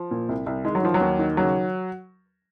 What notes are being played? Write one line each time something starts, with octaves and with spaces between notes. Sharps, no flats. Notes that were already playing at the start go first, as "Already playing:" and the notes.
Already playing: F3
A#2
C2
C2
D#3 G#3
F#3
D#3 F3
F#3
D#2
D#3
C#3 F#3